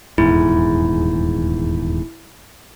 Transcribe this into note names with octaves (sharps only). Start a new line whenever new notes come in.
D#1 E2 G#2 E4